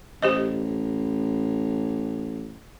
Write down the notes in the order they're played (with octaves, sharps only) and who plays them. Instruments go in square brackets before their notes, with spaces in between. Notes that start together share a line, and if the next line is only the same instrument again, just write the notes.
[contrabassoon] A1 [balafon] G4 C5 D#5